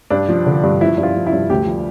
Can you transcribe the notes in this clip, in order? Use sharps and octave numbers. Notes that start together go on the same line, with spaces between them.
G2 D4
F3
D3
G2
F3 E4
G2
F4
F3
E4
G2
D2 G4
F3